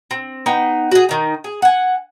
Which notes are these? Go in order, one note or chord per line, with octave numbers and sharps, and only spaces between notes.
C4
B3 D#4 G5
F#4 G#4
D#3 D#4
G#4
F#5 G#5